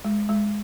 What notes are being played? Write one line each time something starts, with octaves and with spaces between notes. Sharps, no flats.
G#3
G#3